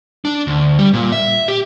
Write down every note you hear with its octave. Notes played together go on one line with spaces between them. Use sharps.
D4
D2
G3
A#2
E5
G4